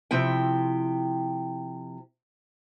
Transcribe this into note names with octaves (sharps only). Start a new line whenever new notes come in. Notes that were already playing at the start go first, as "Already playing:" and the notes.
C3 F3 E4 G5